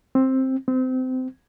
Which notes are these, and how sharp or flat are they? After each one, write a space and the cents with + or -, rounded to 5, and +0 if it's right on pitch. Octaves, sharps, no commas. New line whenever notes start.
C4 +10
C4 -25